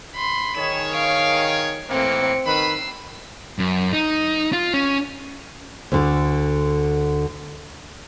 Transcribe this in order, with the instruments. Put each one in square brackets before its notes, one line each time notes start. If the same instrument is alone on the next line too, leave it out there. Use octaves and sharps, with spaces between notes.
[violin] B5 C6
[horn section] D#3 G#4 C#5 [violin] E7
[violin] F5 D7
[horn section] A2 E3 A#3 [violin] C4 C#7
[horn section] D#3 B4 B5 [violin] E6 C7
[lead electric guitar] F#2
D#4
F4
C#4
[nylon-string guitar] D2 D3